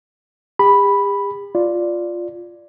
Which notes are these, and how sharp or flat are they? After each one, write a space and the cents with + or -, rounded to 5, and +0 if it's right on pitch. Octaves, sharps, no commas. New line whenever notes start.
G4 +45 B5 +0
F4 +0 D5 +0